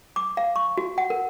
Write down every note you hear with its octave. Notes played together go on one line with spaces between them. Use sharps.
D6
F5
C#6
F#4
F#5
A#4